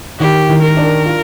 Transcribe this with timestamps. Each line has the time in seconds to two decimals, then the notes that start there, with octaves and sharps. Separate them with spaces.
0.20 D#3 G4
0.49 D#3
0.62 A#4
0.77 D4
1.06 F4